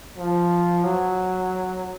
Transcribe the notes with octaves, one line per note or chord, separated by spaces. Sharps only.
F3
F#3